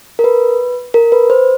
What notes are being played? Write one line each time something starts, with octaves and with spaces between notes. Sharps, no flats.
A#4
B4
A#4
B4
C5